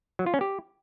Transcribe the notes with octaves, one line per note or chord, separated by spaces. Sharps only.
F#3
F4
C#4
G4